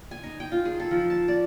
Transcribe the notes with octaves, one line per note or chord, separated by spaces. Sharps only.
G#5
D#4
G5
F4
G#4
A4
F3
A5
D5